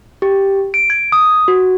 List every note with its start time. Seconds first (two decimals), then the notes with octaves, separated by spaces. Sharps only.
0.22 G4
0.74 D7
0.90 G#6
1.12 D#6
1.48 F#4